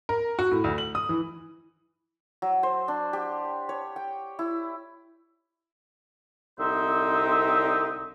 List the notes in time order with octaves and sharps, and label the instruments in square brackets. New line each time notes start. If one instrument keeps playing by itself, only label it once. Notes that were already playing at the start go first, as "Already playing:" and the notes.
[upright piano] A#4
F#4
A2
D2
F#7
D#6
E3
[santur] F#3
C5
D4
G4
C#5
G5
E4
[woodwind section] C2 D3 C4 D#4 C5 E5